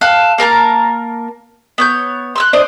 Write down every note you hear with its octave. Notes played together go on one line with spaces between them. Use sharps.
A4 F5 F#6
A#3 A#4 A5 A#5
B3 C#5 G6
C6 E6 F#6
D4 C5 D5 D#5